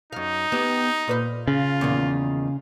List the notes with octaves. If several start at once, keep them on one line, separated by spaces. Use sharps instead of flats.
F#2 D#4 F5
B3 G4
A#2 B4 F5
C#3 F4
E2 A#2 D#3